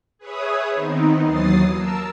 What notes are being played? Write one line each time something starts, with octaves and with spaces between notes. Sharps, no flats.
G#4 B4 C#5 E5 D#6
D#3 B3 C4 D#4
D#2 E3 F#3 D#6 A6 C7
A#4 A5 E6